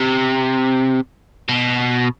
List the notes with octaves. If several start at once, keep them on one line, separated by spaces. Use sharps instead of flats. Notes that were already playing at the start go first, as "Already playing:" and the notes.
Already playing: C3
B2